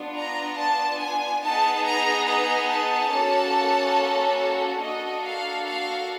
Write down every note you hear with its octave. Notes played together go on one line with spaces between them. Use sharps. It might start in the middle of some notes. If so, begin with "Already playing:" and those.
Already playing: B3 D4 F4
A#5
A5
G#5
B3 D#4 G#4 A5
A#5
A#5
A5
A#3 C#4 F#4 A4
A#3 D4 F#4 A4 D#5
F5
F5